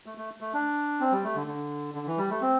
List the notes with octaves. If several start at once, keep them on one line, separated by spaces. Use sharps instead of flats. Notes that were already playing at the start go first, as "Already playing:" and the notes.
A3
A3
A3
D4
C4
G3
A3
D3
D3
D3
E3
G3
A3
C4